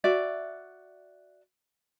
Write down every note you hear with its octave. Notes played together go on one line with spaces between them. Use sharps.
F#4 D5 E5